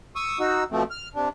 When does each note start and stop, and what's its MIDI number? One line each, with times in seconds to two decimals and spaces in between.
0.16 0.39 85
0.16 0.39 87
0.16 0.39 88
0.39 0.64 63
0.39 0.64 66
0.39 0.64 88
0.71 0.83 47
0.71 0.83 53
0.71 0.83 57
0.71 0.83 60
0.91 1.09 89
1.15 1.29 48
1.15 1.29 62